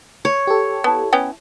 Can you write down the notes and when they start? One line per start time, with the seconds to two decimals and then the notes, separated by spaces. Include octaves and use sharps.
0.25 C#5
0.47 G4 A4
0.84 B3 E4 A5 B5
1.13 B3 C#4 G5